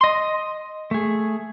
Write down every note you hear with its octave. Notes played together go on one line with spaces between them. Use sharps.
D#5 C6
A3 G#4